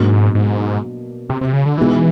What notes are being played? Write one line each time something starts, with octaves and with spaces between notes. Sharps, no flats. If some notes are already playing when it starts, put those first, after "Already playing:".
Already playing: G#2 B2 F#3 A#3 D4
G#2
C3
C3
C#3
D3
B2 E3 G#3 B3 D#4